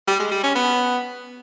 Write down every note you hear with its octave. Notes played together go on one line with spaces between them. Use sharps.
G3
G#3
G3
C#4
B3